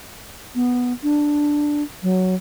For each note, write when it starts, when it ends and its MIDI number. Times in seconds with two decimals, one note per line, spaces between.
0.55 0.93 59
1.03 1.83 62
2.03 2.35 54